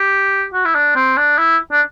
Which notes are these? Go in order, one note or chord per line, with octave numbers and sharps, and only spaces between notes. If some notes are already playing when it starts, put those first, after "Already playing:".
Already playing: G4
F#4
E4
D4
C4
D4
E4
D4